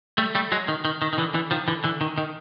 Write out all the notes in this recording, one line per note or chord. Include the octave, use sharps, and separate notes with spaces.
G3 A3
G3 A3
F#3 G#3
D#3
D#3
D#3
D#3
D3 E3
D3 E3
D#3 F3
D3 E3
D3 E3
D#3
D#3